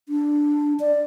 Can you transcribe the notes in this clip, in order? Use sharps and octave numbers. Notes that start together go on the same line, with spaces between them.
D4
D5